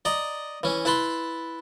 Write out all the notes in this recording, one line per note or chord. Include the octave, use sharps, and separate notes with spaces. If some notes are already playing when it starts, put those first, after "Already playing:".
D5 D#5 A#5
E3 C#4
E4 B4 A5 B5 C6